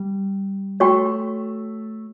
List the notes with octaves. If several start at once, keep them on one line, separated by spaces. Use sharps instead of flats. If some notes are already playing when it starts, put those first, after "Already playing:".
Already playing: G3
A3 F#4 C#5 G5 C#6